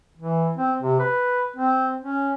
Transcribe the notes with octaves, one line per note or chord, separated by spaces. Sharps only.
E3
C4
C3
B4
C4
C#4